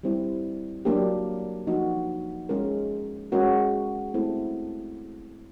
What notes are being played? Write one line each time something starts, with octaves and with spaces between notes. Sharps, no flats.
G3 C4 E4
F#3 A#3 D4 G4
F3 A#3 D#4 F#4
G#3 C#4 F4 A#4
G#3 C#4 F#4 A#4
A3 C4 E4 A4